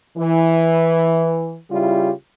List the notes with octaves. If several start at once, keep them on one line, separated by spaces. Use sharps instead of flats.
E3
C#3 G3 E4 F4 G4